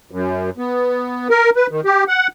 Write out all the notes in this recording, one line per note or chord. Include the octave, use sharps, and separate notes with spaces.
F#2
B3
A#4
B4
D#3
G4
F#5